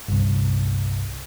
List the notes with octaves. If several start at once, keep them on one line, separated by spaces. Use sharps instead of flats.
G1 C2